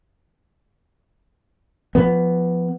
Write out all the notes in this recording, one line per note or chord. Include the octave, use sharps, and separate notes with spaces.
F3 B3